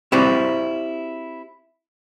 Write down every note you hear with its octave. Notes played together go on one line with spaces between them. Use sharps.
C4 E4 F#4 G4 C5 D5